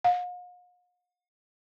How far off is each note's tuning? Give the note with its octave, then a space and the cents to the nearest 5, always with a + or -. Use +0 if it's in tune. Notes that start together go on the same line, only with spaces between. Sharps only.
F5 +45